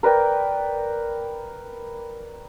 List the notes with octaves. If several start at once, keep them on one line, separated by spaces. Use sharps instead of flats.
A#4 B4 D5 G5